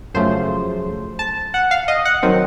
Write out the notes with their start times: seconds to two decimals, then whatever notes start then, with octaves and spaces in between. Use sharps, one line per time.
0.14 F#2 C#3 F3 A3 C5
1.19 A5
1.54 F#5
1.71 F5
1.88 D#5
2.05 F#5
2.23 D#3 F#3 C4